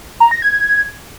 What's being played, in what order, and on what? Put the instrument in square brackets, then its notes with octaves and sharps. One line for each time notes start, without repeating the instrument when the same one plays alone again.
[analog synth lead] A#5
A#6
G#6